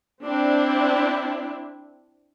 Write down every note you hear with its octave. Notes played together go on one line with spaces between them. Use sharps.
C4 D4 E4